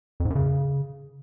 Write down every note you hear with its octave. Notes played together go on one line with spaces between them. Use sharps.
F2
G#2
F#2
C#3